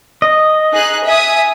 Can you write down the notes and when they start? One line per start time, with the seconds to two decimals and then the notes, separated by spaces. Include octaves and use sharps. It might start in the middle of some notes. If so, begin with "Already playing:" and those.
0.22 D#5
0.73 D#4 G#4 F#6
1.06 E5 G#5 D#6